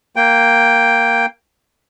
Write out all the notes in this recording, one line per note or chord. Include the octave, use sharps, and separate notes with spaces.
A#3 G5